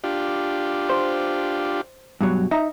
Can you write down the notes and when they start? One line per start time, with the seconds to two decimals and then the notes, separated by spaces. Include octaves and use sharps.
0.04 D4 F4 G4
0.90 C5
2.21 G2 B2 F#3
2.51 D#4 E5 A#5